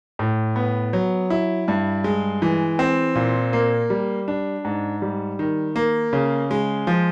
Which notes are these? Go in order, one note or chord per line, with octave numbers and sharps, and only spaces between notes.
A2
B3
F#3
E4
G2
G#3
E3
C4
A#2
A#3
G3
D4
G#2
G3
D#3
A#3
C#3
G#3
F3